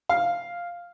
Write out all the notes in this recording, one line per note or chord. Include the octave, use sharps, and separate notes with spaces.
F5